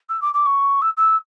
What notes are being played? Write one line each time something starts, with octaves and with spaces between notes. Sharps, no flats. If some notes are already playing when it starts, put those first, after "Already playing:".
E6
D6
D6
C#6
E6
E6